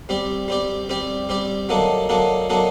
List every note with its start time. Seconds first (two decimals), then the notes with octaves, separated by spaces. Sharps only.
0.09 G3 C4 G4 D5
0.48 G3 C4 G4 D5
0.89 G3 C4 G4 D5
1.29 G3 C4 G4 D5
1.69 F#3 A#3 D4 A4 D#5
2.09 F#3 A#3 D4 A4 D#5
2.49 F#3 A#3 D4 A4 D#5